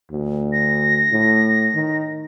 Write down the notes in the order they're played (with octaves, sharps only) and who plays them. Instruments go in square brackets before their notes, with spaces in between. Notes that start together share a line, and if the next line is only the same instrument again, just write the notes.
[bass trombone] D2
[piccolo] A#6
[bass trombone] A2
D#3